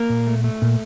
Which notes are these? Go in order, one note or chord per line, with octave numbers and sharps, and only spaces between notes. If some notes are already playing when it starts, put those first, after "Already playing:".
Already playing: A#3 A#4
A#2
A3
A3
A#2